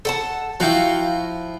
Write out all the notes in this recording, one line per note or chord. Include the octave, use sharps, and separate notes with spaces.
A4 F#5 A5
F3 E4 F#4 F5 G5